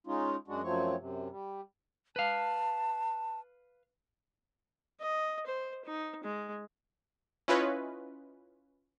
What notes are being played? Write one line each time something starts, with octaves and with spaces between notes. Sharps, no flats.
G#3 C#4 D#4 F4
F#2 G#3 D4 F#4
F#2 F3 F#3 A3 C4 C#5
F#2 C3
G3
B4 F5 A5
D#5
C5
D#4
G#3
C#4 E4 F4 B4 C#5 D#5